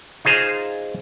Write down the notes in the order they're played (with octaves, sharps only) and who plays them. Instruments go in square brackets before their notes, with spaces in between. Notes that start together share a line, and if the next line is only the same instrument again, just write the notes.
[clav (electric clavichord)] D#4 F4 G#4 C5 A#5